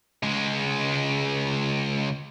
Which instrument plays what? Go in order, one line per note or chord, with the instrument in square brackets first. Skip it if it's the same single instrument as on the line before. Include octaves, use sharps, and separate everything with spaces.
[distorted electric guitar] C#2 G#3